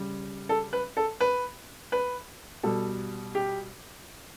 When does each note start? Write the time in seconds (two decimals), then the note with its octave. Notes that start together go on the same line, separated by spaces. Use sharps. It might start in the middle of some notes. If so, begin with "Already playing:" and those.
Already playing: C#3 G3
0.49 A4
0.73 B4
0.97 A4
1.20 B4
1.92 B4
2.63 B2 G3 A4
3.35 G4